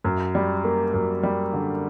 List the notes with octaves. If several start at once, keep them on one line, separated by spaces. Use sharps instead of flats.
F#2
G3
A#3
F#2
G3
D3